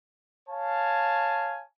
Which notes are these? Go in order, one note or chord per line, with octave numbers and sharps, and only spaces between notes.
C#5 F5 G#5 A5